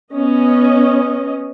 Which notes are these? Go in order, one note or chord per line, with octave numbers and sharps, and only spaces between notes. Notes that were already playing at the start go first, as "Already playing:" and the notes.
B3 C#4 D#5